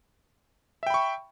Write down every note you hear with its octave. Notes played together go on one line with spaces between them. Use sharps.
E5 G5 B5 C#6